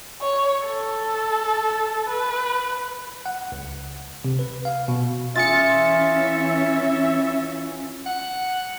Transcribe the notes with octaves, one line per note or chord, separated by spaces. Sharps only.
C#5
A4
B4
F#5
C#2
C3
B4
F5
B2
E3 C#4 F4 G#4 E5 A6 C#7
F#5